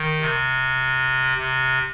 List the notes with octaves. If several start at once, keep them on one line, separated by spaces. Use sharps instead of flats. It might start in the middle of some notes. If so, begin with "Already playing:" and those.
Already playing: D#3
C3
C3